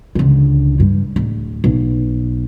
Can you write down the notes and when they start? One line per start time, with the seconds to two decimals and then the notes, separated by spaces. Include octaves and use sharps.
0.15 C#2 D3
0.80 G2
1.16 D1
1.64 B1